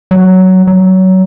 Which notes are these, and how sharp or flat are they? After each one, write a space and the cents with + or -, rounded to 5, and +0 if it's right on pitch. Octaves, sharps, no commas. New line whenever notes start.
F#3 +10
F#3 +20